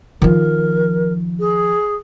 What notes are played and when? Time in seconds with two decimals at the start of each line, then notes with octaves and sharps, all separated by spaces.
0.22 D#3 F3 A#4
1.39 G#4